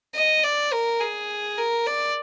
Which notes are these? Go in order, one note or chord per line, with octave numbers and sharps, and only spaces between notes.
D#5
D5
A#4
G#4
A#4
D5